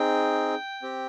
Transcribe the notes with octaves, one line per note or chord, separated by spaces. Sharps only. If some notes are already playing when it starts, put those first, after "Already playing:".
Already playing: C4 D#4 G#4 G5
C4 G4